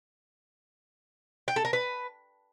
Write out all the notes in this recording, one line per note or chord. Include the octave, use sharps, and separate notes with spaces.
G5
A4
A#4
B4